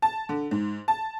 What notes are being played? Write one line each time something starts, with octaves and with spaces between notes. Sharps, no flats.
A5
D3
G#2
A5